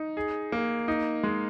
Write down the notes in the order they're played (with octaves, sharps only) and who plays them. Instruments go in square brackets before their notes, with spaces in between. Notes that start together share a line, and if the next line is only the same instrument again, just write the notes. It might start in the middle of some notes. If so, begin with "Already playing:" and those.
Already playing: [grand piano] D#4
G#4
A#3
D#4
G#3